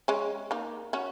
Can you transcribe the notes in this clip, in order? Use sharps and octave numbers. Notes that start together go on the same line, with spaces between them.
G#3 C#4
A#3 D#4
C#4 F#4